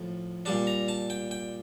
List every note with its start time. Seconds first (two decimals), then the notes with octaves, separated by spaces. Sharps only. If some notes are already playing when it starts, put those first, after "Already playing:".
Already playing: A2 F3
0.45 A#2 G3 D4 A5
0.67 A#5
0.88 A5
1.10 G5
1.31 G5